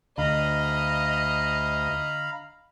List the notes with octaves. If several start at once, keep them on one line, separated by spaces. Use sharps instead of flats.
D2 D3 D#5 F5 A#5 B5